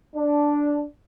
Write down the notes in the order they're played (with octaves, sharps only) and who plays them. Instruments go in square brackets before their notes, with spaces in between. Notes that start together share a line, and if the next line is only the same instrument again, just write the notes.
[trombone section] D4